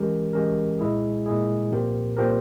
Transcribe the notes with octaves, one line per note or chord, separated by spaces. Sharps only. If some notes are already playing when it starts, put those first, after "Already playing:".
Already playing: E3 G#3 C#4 G4 A#4
E3 G#3 C#4 G4 A#4
A#2 G#3 E4 G#4
A#2 G#3 E4 G#4
A#2 F3 C4 G4 A#4
A#2 F3 C4 G4 A#4